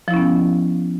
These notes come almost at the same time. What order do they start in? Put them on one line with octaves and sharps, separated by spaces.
F3 E4 C#4 B3